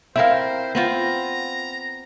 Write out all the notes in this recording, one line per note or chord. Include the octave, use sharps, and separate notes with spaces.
C4 E4 A#4 C5 E5 F5
B3 C4 F4 A#5